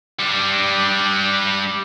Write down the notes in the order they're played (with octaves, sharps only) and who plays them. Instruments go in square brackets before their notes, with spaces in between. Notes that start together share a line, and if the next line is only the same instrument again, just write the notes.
[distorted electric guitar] G3 D4